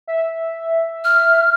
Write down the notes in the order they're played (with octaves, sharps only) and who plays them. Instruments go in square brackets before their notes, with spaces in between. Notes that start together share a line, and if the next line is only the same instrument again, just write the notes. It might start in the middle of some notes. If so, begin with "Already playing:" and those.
[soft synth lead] E5
[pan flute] F6